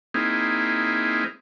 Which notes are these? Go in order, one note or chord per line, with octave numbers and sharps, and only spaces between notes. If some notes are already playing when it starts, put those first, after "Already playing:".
A#3 C4 D#4 E4 G#4